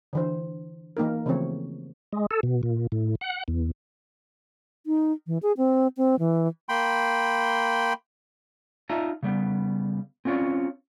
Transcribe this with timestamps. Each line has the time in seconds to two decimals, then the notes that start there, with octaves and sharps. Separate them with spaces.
0.13 D3 E3 C5
0.97 E3 A#3 D#4 A#4
1.26 C#3 E3 F3 A3 C4 C#5
2.13 G#3
2.31 A4
2.43 B2
2.63 A#2
2.92 A2
3.21 F#5
3.48 E2
4.86 D#4
5.27 E3
5.43 G#4
5.57 C4
5.97 C4
6.19 E3
6.69 A#3 G5 B5 C6
8.89 D#4 F4 D5 E5 A5 A#5
9.23 C#3 G3 B3
10.25 C4 C#4 F4 C#5 D5